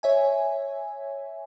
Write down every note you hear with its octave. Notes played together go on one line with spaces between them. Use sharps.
C#5 E5 G#5